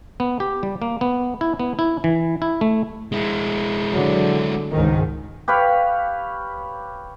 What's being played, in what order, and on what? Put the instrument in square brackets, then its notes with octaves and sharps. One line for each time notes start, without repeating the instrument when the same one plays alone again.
[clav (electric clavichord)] B3
G4
G3
A#3
B3
E4
B3
E4
E3
E4
A3
[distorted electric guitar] G#3 E4
[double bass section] D3 F#3
C#2 G#2 D#3
[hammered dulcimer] G4 B4 C#5 F5